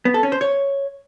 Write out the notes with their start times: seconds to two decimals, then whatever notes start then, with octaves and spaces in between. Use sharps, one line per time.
0.05 B3
0.14 A4
0.23 C#4
0.32 C5
0.41 C#5